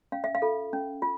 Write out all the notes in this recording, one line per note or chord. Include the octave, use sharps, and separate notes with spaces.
C#4 F5
E5
F5
F4 A4
C#4
F4